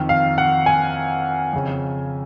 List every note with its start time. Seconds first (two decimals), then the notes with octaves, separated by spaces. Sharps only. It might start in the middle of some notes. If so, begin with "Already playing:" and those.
Already playing: F2 D#3
0.09 F5
0.38 F#5
0.66 G#5
1.53 F2 C#3